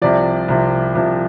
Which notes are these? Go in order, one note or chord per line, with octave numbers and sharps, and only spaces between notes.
C2 C3 F3 D5
C2 C3 F3
C2 C3 F3